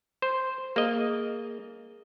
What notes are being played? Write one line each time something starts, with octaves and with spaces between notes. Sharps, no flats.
C5
A#3 G#4 D#5